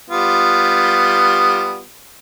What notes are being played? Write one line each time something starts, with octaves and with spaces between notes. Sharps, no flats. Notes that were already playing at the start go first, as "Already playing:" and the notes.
G3 B3 F4